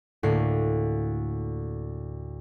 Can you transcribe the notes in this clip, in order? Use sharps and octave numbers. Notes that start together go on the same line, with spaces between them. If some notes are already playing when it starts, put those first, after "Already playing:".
D2 A2 A#3 C7